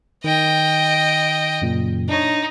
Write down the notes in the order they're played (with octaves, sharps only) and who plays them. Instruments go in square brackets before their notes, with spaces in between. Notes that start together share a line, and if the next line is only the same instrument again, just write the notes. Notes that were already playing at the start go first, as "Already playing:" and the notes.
[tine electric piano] D#3 [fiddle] D#5 G5
[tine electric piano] F#2 A#2 C#3
[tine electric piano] D4 C#5 [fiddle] D#4